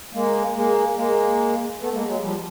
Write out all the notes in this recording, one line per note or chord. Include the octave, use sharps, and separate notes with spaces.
G#3 A#3
G#3 A#3
G#3 A#3
A3 B3
G#3 A#3
F#3 G#3
F3 G3